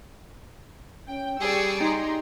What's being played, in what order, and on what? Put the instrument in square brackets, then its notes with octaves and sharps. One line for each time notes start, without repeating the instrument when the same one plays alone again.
[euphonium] C#4 [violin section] G5
[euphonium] G3 [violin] G#4 D5 [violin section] G5 C#6 E6
[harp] D#4 [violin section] G5 A#5 C6